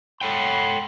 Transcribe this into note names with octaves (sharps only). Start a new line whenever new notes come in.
A4 C#5 F#5 G5 B5 C6